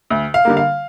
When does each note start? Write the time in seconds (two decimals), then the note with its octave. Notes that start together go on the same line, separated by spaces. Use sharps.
0.10 D2
0.34 F5
0.45 D3 G3 A#3
0.57 F5